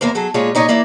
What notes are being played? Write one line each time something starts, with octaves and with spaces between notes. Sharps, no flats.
E2 A#3 A#4 C5
F#3 G#4 A4
A#2 G#3 F4 G#4 C#5
A#2 D#4 C#5 D#5
E3 A#3 E4 D5